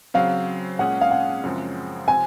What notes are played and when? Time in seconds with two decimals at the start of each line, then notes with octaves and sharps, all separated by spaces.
0.14 C#3 F#3 C4 F5
0.79 A#2 G#3 C#4 G#4 F#5
1.01 F5
1.11 F#5
1.44 F#2 C#3 F3 G#3 C4
2.07 C3 F3 C4 G#5